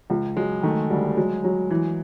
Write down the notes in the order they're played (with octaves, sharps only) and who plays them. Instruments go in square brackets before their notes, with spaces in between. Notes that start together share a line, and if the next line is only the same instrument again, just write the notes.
[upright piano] C#2
[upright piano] F#3 [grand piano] G#3
[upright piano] D#3 [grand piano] A3
[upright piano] D2 [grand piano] G3
[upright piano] F#3 [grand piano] G#3
[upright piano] F#3
E3